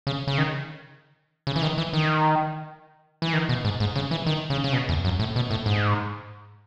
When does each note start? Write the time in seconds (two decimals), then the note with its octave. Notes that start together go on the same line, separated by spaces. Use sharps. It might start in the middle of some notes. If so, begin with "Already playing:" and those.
0.07 C#3
0.27 C#3
0.38 D#3
1.47 C#3
1.56 E3
1.62 D#3
1.78 E3
1.93 D#3
3.22 E3
3.33 D#3
3.49 B2
3.64 G#2
3.80 G#2
3.96 C#3
4.11 E3
4.26 D#3
4.50 C#3
4.64 C#3
4.73 B2
4.89 E2
5.04 F#2
5.19 A2
5.36 B2
5.51 A2
5.66 G#2